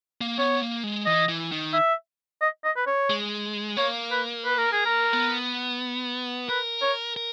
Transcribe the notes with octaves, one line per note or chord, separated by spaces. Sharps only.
A#3
B3 C#5
A#3
G#3
E3 D#5
E3
D#3
E5
D#5
D#5
B4
C#5
G#3
A#3 C#5
B4
B4
A#4
G#4
A#4
B3
A#4 B4
C#5
A#4